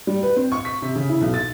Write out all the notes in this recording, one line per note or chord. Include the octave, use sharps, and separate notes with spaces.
G3
B4
C4
C#6
B6
C3
C#3
E4
B1
A6